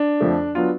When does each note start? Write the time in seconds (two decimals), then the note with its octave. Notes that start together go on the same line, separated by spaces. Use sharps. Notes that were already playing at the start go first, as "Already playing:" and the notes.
Already playing: D4
0.20 F2 F3 A3
0.55 F#3 B3 D4 F4